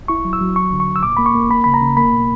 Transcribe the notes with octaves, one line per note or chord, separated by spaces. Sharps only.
E4 C#6
F#3
E6
F#3
D2 C#6
D3
C#6
D2
E6
A#2 D6
A#3 B5
C#6
A#3
A#3 B5
C#3 B5
A#5
C#3
A#3 B5
B2